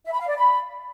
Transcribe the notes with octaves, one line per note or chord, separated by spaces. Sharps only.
E5
B5
F5
D5
B5